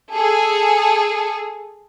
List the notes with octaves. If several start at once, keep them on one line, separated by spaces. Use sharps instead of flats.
G#4 A4